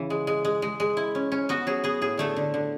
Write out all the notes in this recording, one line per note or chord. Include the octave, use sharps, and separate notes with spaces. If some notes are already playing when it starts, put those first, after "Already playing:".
Already playing: C#3 E3
G#3
G#3
G#3
G#3
G#3
E4
C#4
C#4
B3 F#4
F#3 G#4
B3 G#4
A2 G#4
D3 A3 A4
D3
D3